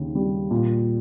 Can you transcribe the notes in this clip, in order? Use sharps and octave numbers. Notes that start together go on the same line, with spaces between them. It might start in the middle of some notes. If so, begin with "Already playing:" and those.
Already playing: D#2 C#3
G3
A#2